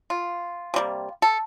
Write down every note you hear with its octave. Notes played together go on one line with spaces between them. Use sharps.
F4
C3 G3 A#3
A4